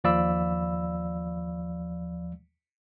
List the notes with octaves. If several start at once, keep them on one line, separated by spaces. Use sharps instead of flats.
D#2 F3 D5 F5 B5 E6